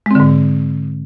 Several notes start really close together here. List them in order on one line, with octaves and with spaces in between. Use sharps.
G#3 C4 D3 G#2